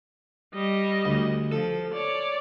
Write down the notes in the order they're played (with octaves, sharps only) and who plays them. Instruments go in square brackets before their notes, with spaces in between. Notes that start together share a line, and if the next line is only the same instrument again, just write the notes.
[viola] G3 D#5
[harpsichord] D2
[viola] F3 [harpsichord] A4
[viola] C#5 D5